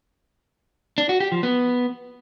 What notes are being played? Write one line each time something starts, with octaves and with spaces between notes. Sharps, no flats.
D4
F#4
G4
F3
B3